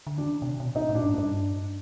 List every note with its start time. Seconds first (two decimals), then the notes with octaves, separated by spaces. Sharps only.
0.07 D3
0.17 D#3 D4
0.42 B2
0.46 C3
0.60 B2
0.75 A#2 D#4
0.89 A2
0.95 D4
1.04 G#2
1.14 G2 D4